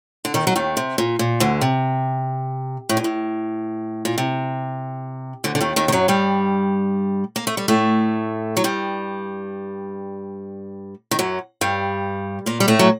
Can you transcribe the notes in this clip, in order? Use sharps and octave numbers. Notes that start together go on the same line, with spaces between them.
D3
D#2 D#3
F#3
D#2 D#3
C3
A#2
A#2
D2 D3
C3
A2
G2
A2
A#2
C3
D2 D3
D3
D#2 D#3
D#2 D#3
D#3
F#2 F#3
G2 G3
A#3
A3
G3
A2 A3
F#3
G2 G3
D#3
F#2 F#3
G2 G3
A#2 A#3
G3
A2 A3
F#3